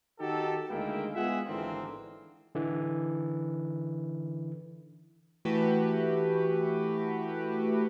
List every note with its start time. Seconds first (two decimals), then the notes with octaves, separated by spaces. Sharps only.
0.19 D#3 D#4 F#4 G4 A4
0.68 D2 D#3 G#3 A#3 E4 G5
1.15 G#3 B3 F4 G#4 E5 F#5
1.47 G#1 D3 E3 G#3 A#3 C4
2.55 D3 E3
5.45 E3 A3 F#4 G4 B4